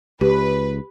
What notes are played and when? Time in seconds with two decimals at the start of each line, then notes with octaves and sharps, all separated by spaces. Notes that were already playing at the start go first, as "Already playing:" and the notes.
0.21 C#2 G4 B4